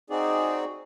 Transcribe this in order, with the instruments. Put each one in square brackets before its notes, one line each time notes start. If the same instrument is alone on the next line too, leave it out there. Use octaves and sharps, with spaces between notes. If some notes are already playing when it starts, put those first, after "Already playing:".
[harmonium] C4 D#4 F#4 G#4 D5